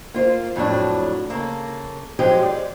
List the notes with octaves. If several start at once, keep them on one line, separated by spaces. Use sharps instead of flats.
A#3 F4 C5 F5
F2 A2 F#3 D4
C#3 A#3 A4
F3 F#3 G#3 G4
D5